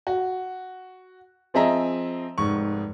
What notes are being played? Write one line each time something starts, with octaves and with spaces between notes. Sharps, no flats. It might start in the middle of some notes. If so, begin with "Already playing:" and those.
F#4
F3 C4 G#4 D#5 E5 A#5
F1 G#2 C#6